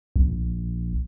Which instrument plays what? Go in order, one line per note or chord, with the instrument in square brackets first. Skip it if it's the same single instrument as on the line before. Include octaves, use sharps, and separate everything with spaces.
[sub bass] A#1